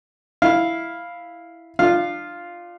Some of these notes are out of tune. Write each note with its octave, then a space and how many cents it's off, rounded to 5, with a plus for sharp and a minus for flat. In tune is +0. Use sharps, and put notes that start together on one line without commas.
E4 +0 F5 +0
D4 +40 F4 +0 F5 +0